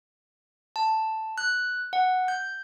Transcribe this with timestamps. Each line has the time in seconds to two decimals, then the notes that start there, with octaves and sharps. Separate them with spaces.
0.76 A5
1.38 F#6
1.93 F#5
2.28 G6